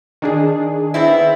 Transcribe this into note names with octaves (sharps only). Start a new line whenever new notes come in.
D#3 D4 G#4
B3 C4 E4